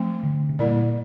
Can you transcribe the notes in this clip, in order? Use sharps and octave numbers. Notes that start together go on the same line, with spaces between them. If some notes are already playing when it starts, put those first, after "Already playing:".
Already playing: F3 A3 C4
D3
C3
A#2 G3 A#3 E4 A#4 D5